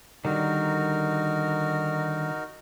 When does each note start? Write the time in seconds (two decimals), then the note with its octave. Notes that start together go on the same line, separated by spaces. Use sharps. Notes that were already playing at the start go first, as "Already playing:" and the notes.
0.25 D3 D#3 G3 D#4 F#4 A#4